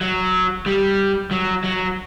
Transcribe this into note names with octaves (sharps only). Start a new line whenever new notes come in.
F#3
G3
F#3
F#3